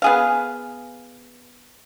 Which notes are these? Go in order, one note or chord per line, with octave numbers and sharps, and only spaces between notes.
B3 G#4 F5